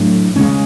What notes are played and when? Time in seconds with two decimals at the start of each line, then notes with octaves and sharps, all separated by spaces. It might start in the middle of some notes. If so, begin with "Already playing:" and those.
Already playing: A2 F#3 A3 D4
0.36 C#3 G#3 C#4